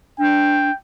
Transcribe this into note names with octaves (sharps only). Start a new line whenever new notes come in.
D4 G5